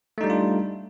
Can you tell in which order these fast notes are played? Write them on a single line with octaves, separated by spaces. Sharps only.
A3 D#4 G3 D4 F4